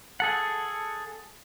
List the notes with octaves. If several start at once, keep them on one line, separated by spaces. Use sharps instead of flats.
G#4 A4 F#5